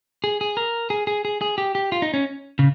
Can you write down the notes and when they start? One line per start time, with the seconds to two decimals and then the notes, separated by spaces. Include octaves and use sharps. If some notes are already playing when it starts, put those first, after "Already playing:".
0.24 G#4
0.41 G#4
0.57 A#4
0.90 G#4
1.07 G#4
1.25 G#4
1.41 G#4
1.58 G4
1.75 G4
1.92 F4
2.02 D#4
2.14 C#4
2.59 C#3